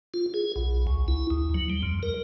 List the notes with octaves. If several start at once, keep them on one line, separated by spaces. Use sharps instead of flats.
F4
G#4
B1
C#2
E4
D#2
F#3
G3
F2
A#4